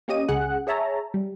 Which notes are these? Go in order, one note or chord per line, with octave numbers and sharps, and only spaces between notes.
A#3 C#4 G4 D#5 D#7
C#2 C#3 G#4 F#5 F#6
G#4 C#5 E5 A5 A#5
G3